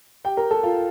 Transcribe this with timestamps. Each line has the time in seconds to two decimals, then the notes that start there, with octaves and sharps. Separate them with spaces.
0.24 G4 G5
0.37 A#4 A#5
0.51 A4 A5
0.63 F4 F5